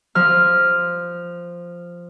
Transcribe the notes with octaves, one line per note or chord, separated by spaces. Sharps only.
F3 F6